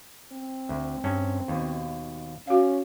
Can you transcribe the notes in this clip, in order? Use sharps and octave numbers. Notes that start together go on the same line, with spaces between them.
C4
D2
G2 C#4
D#2 B2
C#4 F#4 F5